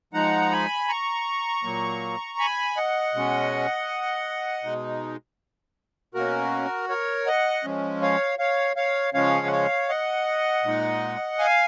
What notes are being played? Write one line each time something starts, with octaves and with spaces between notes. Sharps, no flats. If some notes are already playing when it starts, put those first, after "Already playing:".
F3 G#3 D#4 F#5 A#5
G#5 B5
A#5 C#6
A#2 F#3 A#3
G#5 B5
D#5 F#5
B2 G#3 C#4
B2 G#3 D#4
B2 A#3 C#4 F#4 A#4
A#4 C#5
D#5 F#5
F3 G#3 C#4
C#5 F5
C#5 F5
C#5 F5
C#3 F3 G#3 C#4 C#5 F5
F#5
C#5 F5
D#5 F#5
A#2 G#3 D#4
F5 G#5